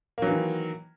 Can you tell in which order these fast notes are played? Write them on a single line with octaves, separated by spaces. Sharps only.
A#3 F#3 E3 D#3